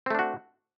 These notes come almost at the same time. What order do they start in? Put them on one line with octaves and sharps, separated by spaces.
C4 A3 D4 F#4